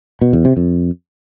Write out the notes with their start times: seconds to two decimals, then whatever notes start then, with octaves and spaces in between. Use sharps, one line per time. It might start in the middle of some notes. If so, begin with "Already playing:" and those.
0.21 B2
0.33 E2
0.45 C3
0.57 F2